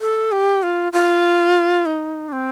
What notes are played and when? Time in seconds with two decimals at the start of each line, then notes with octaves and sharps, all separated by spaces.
0.01 A4
0.32 G4
0.63 F4
0.93 F4
1.86 D#4
2.28 D4
2.32 C4